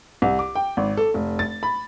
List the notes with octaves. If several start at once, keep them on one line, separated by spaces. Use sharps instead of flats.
C2
D6
G5
G#1
A4
F1
A6
B5